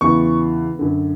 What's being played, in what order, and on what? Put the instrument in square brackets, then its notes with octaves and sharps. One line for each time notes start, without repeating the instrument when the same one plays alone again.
[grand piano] E2 C#3 E3 C#6
F#2 D3